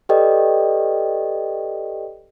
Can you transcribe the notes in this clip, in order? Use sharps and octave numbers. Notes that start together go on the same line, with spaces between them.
G4 A4 B4 D5 D#5 G5